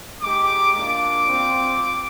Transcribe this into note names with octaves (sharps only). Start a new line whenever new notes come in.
G#3 D#4 G4 D6
A#3 D4 F4 D6
C4 F4